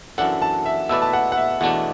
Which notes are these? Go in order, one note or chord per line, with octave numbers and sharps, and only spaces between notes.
F#2 E3 D4 A4 F#5
A5
E5
B2 A3 E4 B4 D5 E6
A5
F#5
F#5
E5
E2 B2 A3 D4 F#5